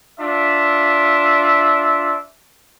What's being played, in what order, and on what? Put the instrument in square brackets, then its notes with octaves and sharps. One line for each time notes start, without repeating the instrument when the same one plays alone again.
[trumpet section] D4 F4 E5